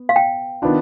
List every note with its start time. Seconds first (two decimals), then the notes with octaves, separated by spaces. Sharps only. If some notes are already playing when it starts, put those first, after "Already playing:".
Already playing: B3
0.09 F5
0.16 G5
0.62 D#3 B3 D4 F4